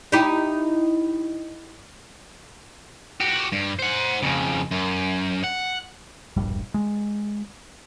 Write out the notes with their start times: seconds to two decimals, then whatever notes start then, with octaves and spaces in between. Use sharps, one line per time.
0.12 D#4 E4 G4
3.20 F#4 G4
3.52 G2
3.79 C5 F#5
4.22 F2 C#3
4.71 F#2
5.44 F#5
6.37 E1 A#1 G2 G3
6.74 G#3